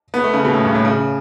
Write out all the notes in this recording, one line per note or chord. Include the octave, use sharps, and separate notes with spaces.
B3
A3
C#3
B2
A2
G2
A2
C#3